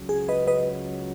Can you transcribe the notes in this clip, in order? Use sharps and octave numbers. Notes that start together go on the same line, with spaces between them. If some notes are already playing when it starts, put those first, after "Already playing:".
Already playing: C#2 C#3 F#3 C#4
G#4
B4 D#5
B4 D#5